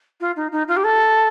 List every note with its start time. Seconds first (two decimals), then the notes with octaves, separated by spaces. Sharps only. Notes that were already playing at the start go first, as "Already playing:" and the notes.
0.20 F4
0.36 D#4
0.52 D#4
0.68 F4
0.76 G4
0.84 A4